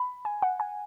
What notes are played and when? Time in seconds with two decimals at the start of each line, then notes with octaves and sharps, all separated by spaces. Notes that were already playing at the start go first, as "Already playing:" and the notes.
Already playing: B5
0.25 G#5
0.42 F#5
0.60 G#5